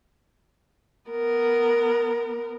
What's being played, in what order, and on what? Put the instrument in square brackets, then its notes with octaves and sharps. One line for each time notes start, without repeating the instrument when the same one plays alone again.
[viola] B3 A#4